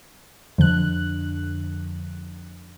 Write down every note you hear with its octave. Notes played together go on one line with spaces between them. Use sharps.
F2 D3 F#6